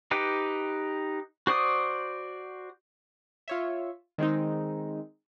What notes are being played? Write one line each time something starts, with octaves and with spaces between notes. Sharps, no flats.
D#4 G4 B4 G5
F#4 C5 D5 D#6
F4 C#5 E5
D#3 G#3 C4 D#4